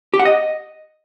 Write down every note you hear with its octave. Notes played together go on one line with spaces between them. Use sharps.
G4
F#5
D#5